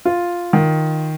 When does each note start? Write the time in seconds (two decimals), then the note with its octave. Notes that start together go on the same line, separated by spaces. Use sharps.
0.05 F4
0.53 D#3